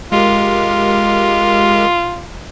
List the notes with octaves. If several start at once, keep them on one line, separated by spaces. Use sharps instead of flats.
G#3 F4 G4 A#4